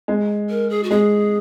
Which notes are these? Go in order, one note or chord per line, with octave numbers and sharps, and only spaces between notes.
G#3
A#4
G#4
F#4
G#3 G#4